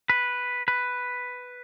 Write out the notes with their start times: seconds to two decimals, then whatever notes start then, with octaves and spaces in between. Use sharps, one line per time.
0.10 B4
0.68 B4